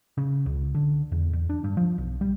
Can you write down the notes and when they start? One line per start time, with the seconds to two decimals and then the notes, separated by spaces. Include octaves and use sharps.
0.18 C#3
0.46 C#2
0.75 D3
1.12 E2
1.33 E2
1.49 D4
1.64 G2
1.77 F3
1.98 B1
2.21 G3